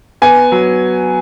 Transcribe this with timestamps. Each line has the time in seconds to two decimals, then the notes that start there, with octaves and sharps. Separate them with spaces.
0.22 B3 G#5
0.52 F#3